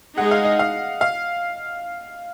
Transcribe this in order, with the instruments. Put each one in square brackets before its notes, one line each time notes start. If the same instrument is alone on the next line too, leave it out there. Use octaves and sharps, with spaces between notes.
[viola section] G#3 D#4 G#4 [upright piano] F#5
[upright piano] F5
D#5
F5
F5